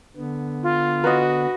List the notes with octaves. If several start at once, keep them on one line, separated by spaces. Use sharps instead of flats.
D3 B3
F4
F#4 B4 D#5